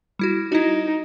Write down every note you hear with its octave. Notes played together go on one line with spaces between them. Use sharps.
G3 E4 F#4
D#4 E4 F#4